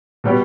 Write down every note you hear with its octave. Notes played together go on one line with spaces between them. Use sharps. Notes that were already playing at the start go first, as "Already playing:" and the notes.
B2 G3 B3 G4